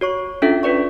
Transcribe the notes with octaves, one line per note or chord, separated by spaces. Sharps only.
F#4 C#5 C#6
C#4 D4 F4 A4 E5 G5
F4 B4 D5 C#6